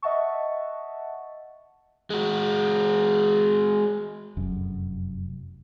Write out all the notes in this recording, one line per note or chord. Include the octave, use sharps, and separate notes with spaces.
D#5 E5 F#5 A5 C#6
G#3 F#4
F1 F#2